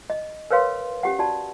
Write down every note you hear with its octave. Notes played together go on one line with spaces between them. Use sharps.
D#5
A#4 B4 C#5 F5 C6
C#4 G4 F#5
F#4 D5 A5